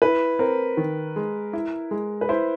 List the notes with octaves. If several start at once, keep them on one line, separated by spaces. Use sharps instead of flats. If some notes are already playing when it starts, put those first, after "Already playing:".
E4 B4
C4 A#4
D#3
G#3
E4
G#3
B4
E4 C5